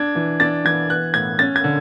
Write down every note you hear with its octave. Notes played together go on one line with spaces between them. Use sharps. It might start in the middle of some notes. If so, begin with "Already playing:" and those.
Already playing: D4 G#6
E3
D4 A6
E3 G#6
B3 F#6
A2 G#6
C#4 A6
G#6
D3